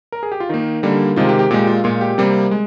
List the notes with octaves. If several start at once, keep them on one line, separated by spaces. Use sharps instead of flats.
A#4
G#4
G4
F4
D#3 A#3 D#4
D3 G3 A#3
C3 D#3 G#3 F4
G4
G4
A#2 G#3 G4
F4
A#2 G#3 F4
G4
C3 G3 A#3
G#3